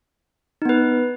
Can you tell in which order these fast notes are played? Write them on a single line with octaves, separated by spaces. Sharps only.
D#4 B3 B4